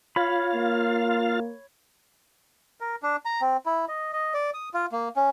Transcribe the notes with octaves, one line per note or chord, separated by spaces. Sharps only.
F4 C#5 F5 B5
A#3
A#4
D4
A#5
C4
E4
D#5
D#5
D5
D#6
F4
A#3
C#4